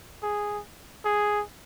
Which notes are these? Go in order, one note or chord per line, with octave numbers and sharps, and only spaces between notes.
G#4
G#4